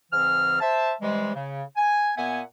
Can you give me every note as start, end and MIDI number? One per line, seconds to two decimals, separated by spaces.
0.12 0.57 44
0.12 0.57 49
0.12 0.57 52
0.12 0.57 60
0.12 0.57 89
0.61 0.93 72
0.61 0.93 76
0.61 0.93 81
1.01 1.34 48
1.01 1.34 52
1.01 1.34 55
1.01 1.34 56
1.35 1.63 49
1.77 2.12 80
2.17 2.41 46
2.17 2.41 59
2.17 2.41 76
2.17 2.41 78
2.17 2.41 80